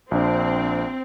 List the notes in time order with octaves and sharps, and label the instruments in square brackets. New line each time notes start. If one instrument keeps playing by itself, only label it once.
[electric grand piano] A#1 D4 [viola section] C4